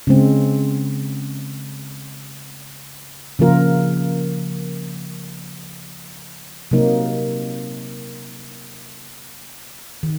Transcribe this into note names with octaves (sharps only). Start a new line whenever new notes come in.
C#3 G#3 C4
C#3 F3 A#3 F4 A#4
C3 F#3 A#3 D#4
D#3